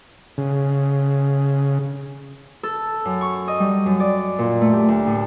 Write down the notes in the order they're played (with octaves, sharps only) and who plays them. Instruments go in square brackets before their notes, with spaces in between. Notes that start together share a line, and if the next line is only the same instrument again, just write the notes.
[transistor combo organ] C#3
[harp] A4
F#2
C#6
D#5
G3
F#2
D5
A#2
A3
G4
D2
A2